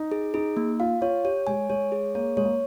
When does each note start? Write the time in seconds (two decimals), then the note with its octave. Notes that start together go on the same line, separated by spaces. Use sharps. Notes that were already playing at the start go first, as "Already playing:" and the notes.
Already playing: D#4
0.12 G#4
0.34 D#4 G#4
0.57 A#3
0.80 F4 F5
1.01 F4 C#5
1.24 G4 C#5
1.47 G#3 G#5
1.70 G#3 C#5
1.92 G#4
2.15 A#3 C#5
2.37 G#3 C#5
2.45 A#3